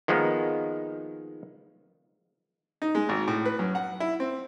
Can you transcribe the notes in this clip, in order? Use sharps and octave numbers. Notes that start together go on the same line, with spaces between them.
D#3 F3 G#3 A#3 B3 D#4
D#4
G#3
G#1
A2
B4
F#2
F#5
E4
C4